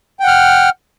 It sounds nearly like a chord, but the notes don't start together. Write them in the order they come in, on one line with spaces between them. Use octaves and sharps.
G5 F#5 F6